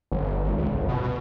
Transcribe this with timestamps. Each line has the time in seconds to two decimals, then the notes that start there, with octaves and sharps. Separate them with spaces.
0.12 G1
0.44 G#1
0.58 C#2
0.71 G1
0.89 B2
1.03 B2